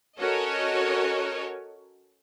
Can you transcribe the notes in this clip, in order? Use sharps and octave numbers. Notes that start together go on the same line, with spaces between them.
C#4 F#4 A4 A#4 C#5 D#5